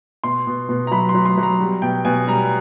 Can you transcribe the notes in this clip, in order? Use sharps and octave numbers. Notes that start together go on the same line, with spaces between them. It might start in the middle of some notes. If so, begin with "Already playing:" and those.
B2 C6
B2
B2
A#5
F#3 B5
C6
F#3
C6
F#3
A#5
G3
B2 G5
B2 G#5
G3 A#5